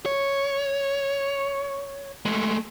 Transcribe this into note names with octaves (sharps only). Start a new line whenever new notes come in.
C#5
G#3 A3